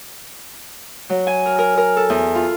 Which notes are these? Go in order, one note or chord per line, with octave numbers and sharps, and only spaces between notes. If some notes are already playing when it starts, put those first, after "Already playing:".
F#3
G#5
A#4
A#4
A#4
A4
E2
F4